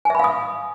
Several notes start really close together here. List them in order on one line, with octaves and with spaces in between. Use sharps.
G#5 E5 B5 F5 D#6